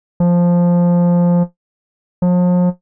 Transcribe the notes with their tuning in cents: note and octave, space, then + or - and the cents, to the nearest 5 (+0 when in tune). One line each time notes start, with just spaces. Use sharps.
F3 +0
F3 +40